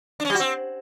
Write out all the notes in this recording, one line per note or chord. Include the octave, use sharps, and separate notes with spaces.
D4
C#4
G3
F#4
C4